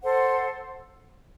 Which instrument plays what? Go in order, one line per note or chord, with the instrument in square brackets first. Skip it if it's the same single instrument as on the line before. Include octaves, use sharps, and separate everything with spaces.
[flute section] A4 C5 F#5